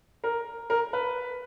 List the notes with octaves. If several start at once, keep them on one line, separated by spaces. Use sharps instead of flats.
A#4
A#4
B4